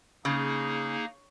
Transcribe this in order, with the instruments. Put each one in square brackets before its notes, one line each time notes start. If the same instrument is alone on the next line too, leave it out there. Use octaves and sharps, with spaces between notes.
[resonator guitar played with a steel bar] C#3 [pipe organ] A#3 D#4 G#4